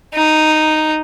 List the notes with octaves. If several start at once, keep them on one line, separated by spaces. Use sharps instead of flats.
D#4